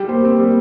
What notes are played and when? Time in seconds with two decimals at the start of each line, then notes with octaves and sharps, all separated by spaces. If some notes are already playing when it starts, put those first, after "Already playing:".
Already playing: G3 G4
0.09 A#3 C5
0.25 C4
0.39 G3